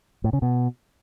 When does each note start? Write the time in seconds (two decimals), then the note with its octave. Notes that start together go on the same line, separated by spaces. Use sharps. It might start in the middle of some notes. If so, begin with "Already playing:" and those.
0.24 A2
0.33 C#3
0.42 B2